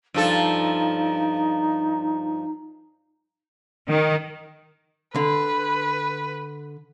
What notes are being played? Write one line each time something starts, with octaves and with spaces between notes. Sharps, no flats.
G2 F3 D#4 A4
D#3
D3 B4